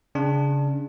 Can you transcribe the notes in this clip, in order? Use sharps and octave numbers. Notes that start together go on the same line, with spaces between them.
C#3 D4